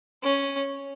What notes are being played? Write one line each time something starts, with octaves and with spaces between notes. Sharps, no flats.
C#4